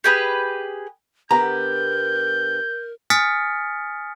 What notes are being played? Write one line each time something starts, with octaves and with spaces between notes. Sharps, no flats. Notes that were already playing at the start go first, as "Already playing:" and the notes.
G4 G#4 B4
D3 B3 G4 A#4 A#5 G6
G#5 D#6 F6 A6 B6 C#7